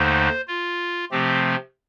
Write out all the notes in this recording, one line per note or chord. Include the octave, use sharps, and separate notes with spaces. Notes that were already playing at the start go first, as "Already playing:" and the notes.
Already playing: D#2 D3 A3 D#4 C5
F4
C3 F3 A3 C4 G4